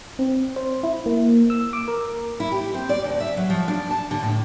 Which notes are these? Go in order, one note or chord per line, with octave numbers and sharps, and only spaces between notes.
C4
C5
E4
A#3
E6
D6
A#4
E4
G4
C4
D5
D2
E5
F#3
F3
D4
A5
D3
A2